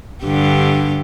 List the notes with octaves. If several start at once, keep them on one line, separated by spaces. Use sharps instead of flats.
G2 D3 G4